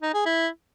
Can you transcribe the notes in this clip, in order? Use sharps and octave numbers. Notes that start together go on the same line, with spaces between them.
D#4
G#4
E4